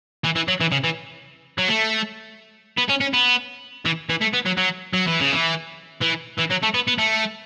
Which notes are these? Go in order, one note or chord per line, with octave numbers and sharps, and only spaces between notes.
E3
E3
F#3
E3
C#3
E3
F#3
A3
B3
C#4
C#4
B3
E3
E3
A3
B3
F#3
F#3
F#3
E3
C#3
E3
E3
E3
F#3
A3
B3
B3
A3